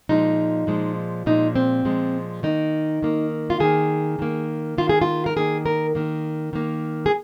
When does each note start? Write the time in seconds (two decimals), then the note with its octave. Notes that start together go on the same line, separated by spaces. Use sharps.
0.09 A#2 F3 G#3 D#4
0.67 A#2 F3 G#3
1.26 A#2 F3 G#3 D#4
1.56 C4
1.85 A#2 F3 G#3
2.43 D#3 A#3 D#4
3.03 D#3 A#3
3.50 F4
3.60 D#3 A#3 G#4
4.19 D#3 A#3
4.78 D#3 A#3 F4
4.89 G#4
5.02 F4
5.26 A#4
5.36 D#3 A#3 G#4
5.66 A#4
5.95 D#3 A#3
6.53 D#3 A#3
7.06 G#4